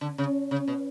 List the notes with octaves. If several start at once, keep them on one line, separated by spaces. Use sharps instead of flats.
D3
C#3
C#3
B2